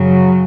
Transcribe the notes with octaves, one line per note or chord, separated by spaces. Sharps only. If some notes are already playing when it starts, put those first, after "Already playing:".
Already playing: F#2 C#3 F#3